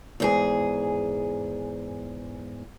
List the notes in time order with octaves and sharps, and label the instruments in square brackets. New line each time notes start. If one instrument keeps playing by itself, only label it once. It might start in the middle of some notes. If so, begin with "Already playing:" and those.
[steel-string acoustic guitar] E2 G#2 G#4